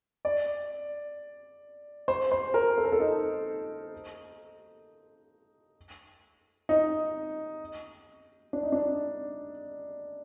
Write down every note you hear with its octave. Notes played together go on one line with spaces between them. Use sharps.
D5
C5
C5
A#4
A4
A#4
A4
D#4
D#4
D4
D#4
D4